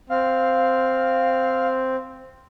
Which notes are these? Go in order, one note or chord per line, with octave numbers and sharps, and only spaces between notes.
C4 F5